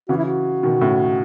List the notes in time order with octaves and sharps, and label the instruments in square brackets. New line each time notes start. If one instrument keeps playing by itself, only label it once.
[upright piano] C#3 E3 [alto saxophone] F#4
[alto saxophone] E4
F#4
[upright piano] B2 D#3
A2 C#3